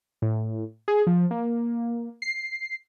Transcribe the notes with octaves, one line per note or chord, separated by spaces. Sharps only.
A2
G#4
F3
A#3
C7